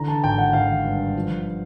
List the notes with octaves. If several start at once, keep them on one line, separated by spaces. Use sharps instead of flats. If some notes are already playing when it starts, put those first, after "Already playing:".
Already playing: D3 E3 A#5
A5
G#1 G5
F#5
G#1 F5
G2
F3